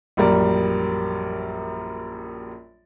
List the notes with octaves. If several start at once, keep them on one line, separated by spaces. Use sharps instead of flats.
A#1 F#2 G3 A#4 D5